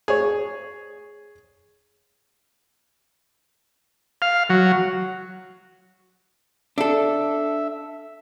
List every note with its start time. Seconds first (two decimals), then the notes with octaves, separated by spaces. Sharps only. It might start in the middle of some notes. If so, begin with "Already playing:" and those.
0.08 G#4 C#5
4.22 F5
4.49 F#3
6.78 D4 A4 E5